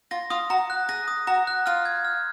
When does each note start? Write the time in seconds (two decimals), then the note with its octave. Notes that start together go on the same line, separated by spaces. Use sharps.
0.11 F4 A#6
0.30 F4 D#6
0.50 F#4 A#5
0.70 F#6
0.89 G#4 A#6
1.08 D#6
1.27 F#4 A#5
1.47 F#6
1.66 F4 F6
1.85 G#6
2.05 F6